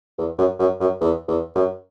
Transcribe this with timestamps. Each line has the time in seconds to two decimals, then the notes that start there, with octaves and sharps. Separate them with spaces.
0.18 E2
0.38 F#2
0.59 F#2
0.80 F#2
1.01 E2
1.28 E2
1.55 F#2